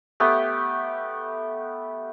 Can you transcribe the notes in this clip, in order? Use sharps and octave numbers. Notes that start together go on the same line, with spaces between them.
A3 B3 G4 G5